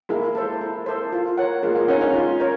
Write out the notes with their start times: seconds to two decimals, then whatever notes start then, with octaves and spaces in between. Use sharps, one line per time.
0.09 G#3 A#3 E4
0.35 A4 C5
0.61 E4
0.86 A4 C5
1.13 F4
1.38 A#4 C#5 F#5
1.63 G#3 A#3 F4
1.75 G#3 A#3
1.88 C#4 D#4 A#4 C#5 F#5
2.01 C#4 D#4
2.14 F4
2.40 A#4 C#5